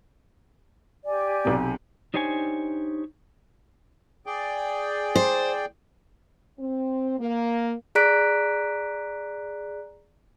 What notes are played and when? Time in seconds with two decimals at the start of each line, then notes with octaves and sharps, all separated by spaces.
1.05 G4 D5 G#5
1.45 B1 C3
2.14 D4 D#4 G4 C5 C#5 G#5
4.26 G#4 D5 G5
5.15 C5
6.59 C4
7.19 A#3
7.95 G#4 D5 A#5 F#6 B6 D7